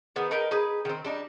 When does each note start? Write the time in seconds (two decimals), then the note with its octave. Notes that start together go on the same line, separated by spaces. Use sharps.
0.16 D#3 B3 G#4
0.31 D#4 A#4 B4 G5
0.51 D#4 G#4 B4
0.85 D#3 C4
1.05 G3 D4 D#4